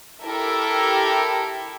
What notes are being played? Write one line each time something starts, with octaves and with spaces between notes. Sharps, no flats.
E4 G4 A4 A#4 E5